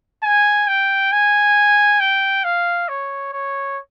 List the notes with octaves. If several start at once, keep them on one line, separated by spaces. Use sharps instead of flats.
G#5
G5
G#5
G5
F5
C#5
C#5